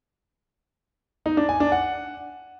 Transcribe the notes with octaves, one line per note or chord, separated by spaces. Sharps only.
D#4
D4
G#5
D4
F#5